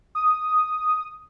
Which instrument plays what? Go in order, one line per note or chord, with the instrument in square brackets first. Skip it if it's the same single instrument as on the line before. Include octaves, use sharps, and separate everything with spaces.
[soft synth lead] D#6